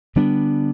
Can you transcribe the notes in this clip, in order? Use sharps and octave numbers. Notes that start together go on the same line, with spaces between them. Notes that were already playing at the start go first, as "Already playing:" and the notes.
D3 G3 B3 D4